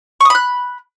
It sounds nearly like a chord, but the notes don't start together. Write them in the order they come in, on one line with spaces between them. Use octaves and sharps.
C#6 D#6 B5 F#6